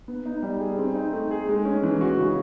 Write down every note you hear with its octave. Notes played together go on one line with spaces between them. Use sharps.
B3
D#4
G3
G#4
C4
D#4
A3
G#4
G#3
C#4
E3
F#4
C#3